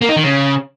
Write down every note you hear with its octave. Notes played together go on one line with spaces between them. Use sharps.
A#3
D#4
D#3
C#3